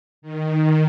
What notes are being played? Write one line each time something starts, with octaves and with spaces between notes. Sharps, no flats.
D#3